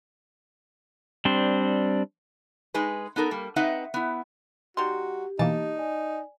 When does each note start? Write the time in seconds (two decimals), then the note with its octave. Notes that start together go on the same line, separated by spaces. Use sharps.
1.25 G3 C4 D4 C5
2.74 G#3 D#4 G#4 B4
3.16 B3 D#4 A4 A#4
3.31 G3 A#3
3.56 C4 D#4 B4 D#5 E5 F#5
3.94 B3 E4
4.77 G3 D#4 F#4 G4 C6
5.39 B2 E3 A#3 D#4 A5
5.76 D5 G#5